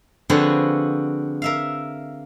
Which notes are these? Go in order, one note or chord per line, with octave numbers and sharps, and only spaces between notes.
D3 F3 C4 F#4 G#4 B4
A#4 E5 F5